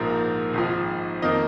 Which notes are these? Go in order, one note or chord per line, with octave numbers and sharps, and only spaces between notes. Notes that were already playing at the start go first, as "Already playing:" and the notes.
Already playing: A#1 G#2 F3 A#3
G#1 G#2 F3
F2 D#3 A#3 D#5